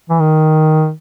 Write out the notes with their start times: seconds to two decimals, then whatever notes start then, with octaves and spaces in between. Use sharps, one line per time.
0.10 E3
0.20 D#3